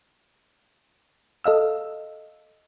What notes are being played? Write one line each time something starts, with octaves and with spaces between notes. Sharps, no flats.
A4 D#5 F5 E6